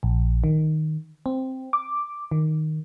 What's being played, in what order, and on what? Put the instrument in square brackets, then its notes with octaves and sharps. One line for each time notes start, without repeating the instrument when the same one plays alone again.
[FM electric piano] A#1
D#3
C4
D6
D#3